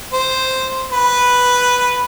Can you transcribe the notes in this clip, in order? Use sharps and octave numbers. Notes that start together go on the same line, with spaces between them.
C5
B4